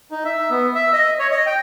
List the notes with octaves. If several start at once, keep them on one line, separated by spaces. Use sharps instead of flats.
D#4
E5
B3
E5
D#5
C#5
D#5
G5